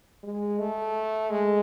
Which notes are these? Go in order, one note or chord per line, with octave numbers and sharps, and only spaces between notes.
G#3
A3
G#3